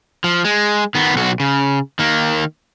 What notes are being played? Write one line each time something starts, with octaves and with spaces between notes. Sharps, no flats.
F3
G#3
D#3 B3
B1 F#4
C#3
D#3 A#3